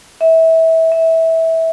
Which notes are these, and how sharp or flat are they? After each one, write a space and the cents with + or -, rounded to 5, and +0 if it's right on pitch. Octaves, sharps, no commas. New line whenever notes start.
E5 -25
E5 -20